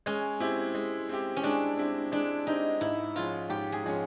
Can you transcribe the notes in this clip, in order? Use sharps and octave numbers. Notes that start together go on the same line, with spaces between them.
G#3 C#4
C4 E4 G4
G#3
C4 E4 G4
C#4
G#3 D4
C4 E4 G4
G#3 D4
C4 D#4 E4 G4
G#2 E4
F3 G#3 C#4 F4
G#2 G4
G#4
F3 G#3 C#4